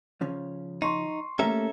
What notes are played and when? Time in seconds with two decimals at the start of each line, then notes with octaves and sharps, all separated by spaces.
0.21 C#3 F3 C#4
0.82 D#4 C6 C#6
1.39 A3 A#3 C#4 G4 A4 E5 A#5